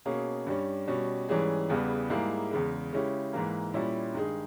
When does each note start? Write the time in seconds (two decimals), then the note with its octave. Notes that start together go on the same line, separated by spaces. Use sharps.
0.06 B2 A#3 C#4 G#4
0.47 G2 G3 C#4
0.88 B2 G3 C#4
1.29 G#2 E3 G3 C#4 G#4
1.69 E2 C#3 E3 G3 B3
2.10 G#2 G3 A#3 E4 G#4
2.51 E2 C#3 G#3
2.93 C#3 G#3 C#4 E4 G4
3.33 G#2 E3 A#3
3.74 A#2 G3 C#4 E4
4.14 G2 D#3 G#3 D#4 G#4